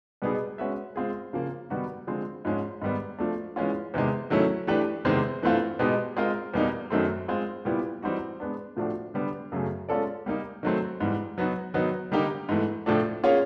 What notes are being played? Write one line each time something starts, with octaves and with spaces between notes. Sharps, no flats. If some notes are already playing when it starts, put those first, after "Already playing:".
B2 G3 B3 D#4 G#4
G#3 C#4 F#4 B4 E5
G#3 C4 F4 G#4
C#3 F3 A#3
D#3 G3 B3 D#4 F#4
D3 F3 G#3 C4
G#2 F3 G#3 C#4
G#2 D#3 G3 B3
F3 A3 D4
E3 G#3 C#4 F4
E2 C3 D#3 G#3
D#3 F#3 A3 C#4 E4
E3 A3 D4 G4 B4
E2 C3 D#3 G#3 C4
G2 E3 A3 C4 F4
B2 G#3 B3 D#4 G4
G#3 C4 F4 A#4 D#5
E2 B2 G3 A#3 D#4
F#2 D#3 F#3 A3 C4
G#3 C4 F4
A#2 G3 B3 E4 G4
E3 G3 C4 D#4 F#4
G#3 B3 D4
A2 F3 A3 D4 F#4
D3 G3 B3 D4
F#2 C#3 F#3 A3
G#3 C#4 F4 A4 D5
G3 A#3 D#4
D#3 F#3 A3 C4
G#2 E3 G3
F#3 B3 D#4 F#4
D#3 F#3 B3 D#4
D3 G3 A#3 D#4 G4
G#2 E3 A3
A2 F3 A3 D4
A#3 C#4 F4 G#4 C#5